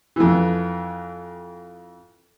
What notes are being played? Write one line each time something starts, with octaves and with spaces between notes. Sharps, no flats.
F2 E3